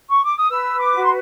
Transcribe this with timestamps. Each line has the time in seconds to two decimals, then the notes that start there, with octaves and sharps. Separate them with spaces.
0.10 C#6
0.23 D6
0.36 D#6
0.50 B4 E6
0.79 D6
0.94 F#4
1.04 C6